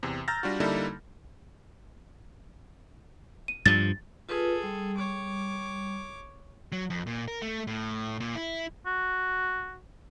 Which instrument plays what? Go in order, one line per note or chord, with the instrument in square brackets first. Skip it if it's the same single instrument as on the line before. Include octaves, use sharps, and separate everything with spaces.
[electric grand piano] E2 C3
A#5 E6 F6 G6 A6 A#6
G3 D4 F4 F#4
D3 G3 A#3 D#4 E4 A4
[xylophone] D#7
[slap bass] G2 F3 [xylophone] A6
[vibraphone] F4 B4 [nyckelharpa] G#4 A4
[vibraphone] G3
[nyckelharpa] C#5 D6
[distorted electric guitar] F#3
F2
A#2
A#4
A3
A2
A#2
E4
[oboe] F#4